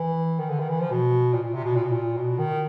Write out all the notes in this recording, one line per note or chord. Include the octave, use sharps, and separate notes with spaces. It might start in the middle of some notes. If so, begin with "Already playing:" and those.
Already playing: E3
D#3
D3
D#3
E3
F3
B2
A#2
A#2
C3
B2
A#2
B2
A#2
B2
D#3